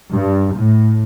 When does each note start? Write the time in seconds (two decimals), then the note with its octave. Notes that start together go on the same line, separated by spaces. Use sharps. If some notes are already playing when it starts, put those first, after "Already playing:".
0.12 G2
0.54 A2